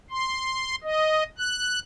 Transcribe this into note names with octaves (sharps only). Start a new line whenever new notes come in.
C6
D#5
F#6